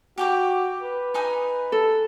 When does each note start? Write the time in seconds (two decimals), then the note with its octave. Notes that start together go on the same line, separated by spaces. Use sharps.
0.18 F#4 G4 G5 D6
0.82 B4
1.14 D#4 G#5 D#6
1.72 A4